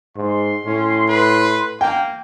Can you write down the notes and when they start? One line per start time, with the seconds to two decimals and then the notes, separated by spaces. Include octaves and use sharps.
0.16 G#2 C6
0.66 A2 C#4
1.09 B4
1.81 A#3 G5